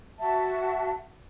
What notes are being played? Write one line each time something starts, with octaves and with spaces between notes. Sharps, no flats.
F#4 E5 A5